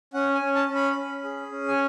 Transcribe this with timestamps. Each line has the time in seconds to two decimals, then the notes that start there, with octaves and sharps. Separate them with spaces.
0.14 C#4 F#5
0.35 G#5
0.41 C#4
0.55 A5
0.69 C#4
0.75 B5
0.96 C#4
1.24 G#4
1.52 C#4
1.68 G#5